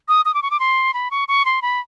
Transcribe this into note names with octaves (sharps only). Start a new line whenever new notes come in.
D#6
D#6
D6
C#6
D6
C6
B5
C#6
C#6
C6
B5